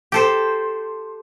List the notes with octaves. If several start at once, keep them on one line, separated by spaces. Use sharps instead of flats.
G4 A4 C5